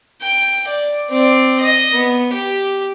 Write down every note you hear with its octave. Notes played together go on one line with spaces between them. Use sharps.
G5
D5
C4 D5
D#5
B3
G4